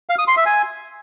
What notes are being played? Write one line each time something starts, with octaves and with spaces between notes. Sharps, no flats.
F5
D#6
C6
E5
G#5